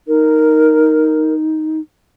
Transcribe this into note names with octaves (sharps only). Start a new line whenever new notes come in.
D#4 A#4